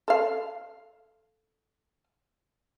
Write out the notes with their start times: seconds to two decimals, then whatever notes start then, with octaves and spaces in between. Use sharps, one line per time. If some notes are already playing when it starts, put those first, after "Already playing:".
0.08 A4 F5